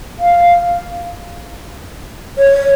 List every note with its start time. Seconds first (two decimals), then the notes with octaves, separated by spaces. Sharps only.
0.20 F5
2.38 C#5